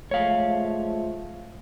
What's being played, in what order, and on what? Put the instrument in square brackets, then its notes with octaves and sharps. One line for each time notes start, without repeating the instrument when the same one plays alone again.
[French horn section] F3 G#3 A3 [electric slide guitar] C#5 F5